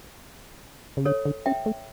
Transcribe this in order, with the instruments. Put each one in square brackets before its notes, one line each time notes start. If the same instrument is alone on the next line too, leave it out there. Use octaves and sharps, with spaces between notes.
[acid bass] C#3
[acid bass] D3 [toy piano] A4 C#5
[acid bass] D3
[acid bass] C#4 [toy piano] E5 G5
[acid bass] A3